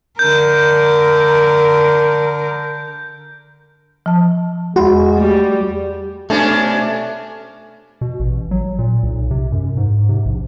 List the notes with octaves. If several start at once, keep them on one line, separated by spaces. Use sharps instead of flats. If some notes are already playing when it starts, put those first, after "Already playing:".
D3 A#4 G6
F3 A5
E2 G#3 F#4 B5 C6
G3 A3
B2 A3 C#4 D4
B2
A1
F#3
A#2
B1
C3
F#2
G#2
C3
A#1